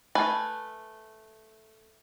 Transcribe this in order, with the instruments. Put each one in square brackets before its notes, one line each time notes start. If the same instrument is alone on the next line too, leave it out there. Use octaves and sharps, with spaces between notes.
[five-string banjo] A3 B4 G#5